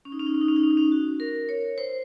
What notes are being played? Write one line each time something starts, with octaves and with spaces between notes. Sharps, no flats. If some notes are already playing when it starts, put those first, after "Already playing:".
C#4
D#4
C#4
D#4
C#4
D#4
C#4
D#4
C#4
D#4
C#4
F#4
A#4
C#5
C5